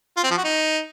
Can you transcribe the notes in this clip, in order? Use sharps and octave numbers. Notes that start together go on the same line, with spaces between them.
F4
C4
F3
F#4
D#4